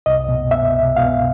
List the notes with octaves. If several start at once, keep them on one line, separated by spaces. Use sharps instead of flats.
C2 D#5
B2
B2 E5
C2
B2 F5